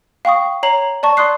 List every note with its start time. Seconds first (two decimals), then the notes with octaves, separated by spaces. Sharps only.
0.25 F5 G5 C#6 D#6
0.63 C#5 A#5 C7 F#7
1.03 D5 A5 C#6
1.17 D5 C6 D#6 F#6 C7